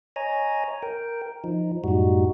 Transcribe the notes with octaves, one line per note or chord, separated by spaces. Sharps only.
C#5 D#5 G#5 A#5
A#4 G5
F3 D#4
F#2 A2 G3 D#4 F#4